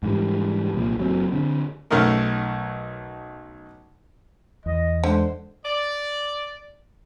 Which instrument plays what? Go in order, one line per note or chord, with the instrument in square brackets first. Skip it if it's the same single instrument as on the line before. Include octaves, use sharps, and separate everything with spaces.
[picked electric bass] G#2 E3 G3
C2 A#2 F3
F#1 F#3 C4
D3 C4
[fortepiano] B1 A3 C#4 D#4 A#4
[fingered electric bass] E2 [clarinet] D#5
[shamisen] D3 [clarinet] G#3 [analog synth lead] C5
[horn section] D5